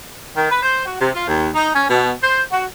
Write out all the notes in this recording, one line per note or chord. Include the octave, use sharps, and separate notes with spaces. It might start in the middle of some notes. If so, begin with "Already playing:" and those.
D#3
B4
C5
F#4
C3
F4
D#2
D#4
C#4
B2
C5
F#4